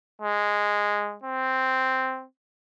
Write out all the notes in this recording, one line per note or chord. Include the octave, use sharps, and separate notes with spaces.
G#3
C4